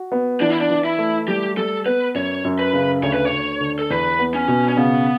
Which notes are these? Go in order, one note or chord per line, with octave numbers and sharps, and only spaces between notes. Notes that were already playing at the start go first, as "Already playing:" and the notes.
Already playing: F#4
B3
E3 D4
E4
D4
E3
E4
A3
G3 G4
G3 A4
B3 B4
F#2 C#5
F#2
B4
C#3
D2 C#5
B4
C#5
D2
D3
A4
E2 B4
B3
C#4
B2
C#4
C#3 B3